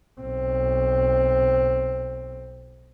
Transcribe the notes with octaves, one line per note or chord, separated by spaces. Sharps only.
B1 C4